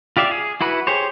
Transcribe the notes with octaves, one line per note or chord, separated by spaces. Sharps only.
F4 G4 D5 E5 F5
G#4
E4 F#4 B4
G4 G#4 C5 C#5